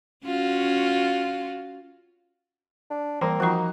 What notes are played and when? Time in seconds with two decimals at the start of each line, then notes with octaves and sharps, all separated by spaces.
0.25 C#4 F4 F#4
2.90 D4
3.21 E3 G3 A#3 C4
3.40 F3 D#4 F4 F#4